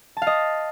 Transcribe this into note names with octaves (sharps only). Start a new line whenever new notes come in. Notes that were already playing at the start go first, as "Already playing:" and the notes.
A5
F5
D#5